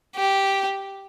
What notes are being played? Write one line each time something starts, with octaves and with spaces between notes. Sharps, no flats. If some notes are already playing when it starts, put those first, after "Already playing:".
G4